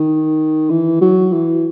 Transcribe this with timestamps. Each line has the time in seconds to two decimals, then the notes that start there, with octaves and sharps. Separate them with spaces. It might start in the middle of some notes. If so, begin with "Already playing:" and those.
Already playing: D#3
0.70 E3
1.01 F#3
1.33 E3